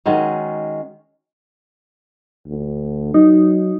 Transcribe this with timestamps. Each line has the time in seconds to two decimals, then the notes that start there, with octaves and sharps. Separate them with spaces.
0.06 D#3 F#3 G#3 C#4
2.46 D2
3.14 F#3 D#4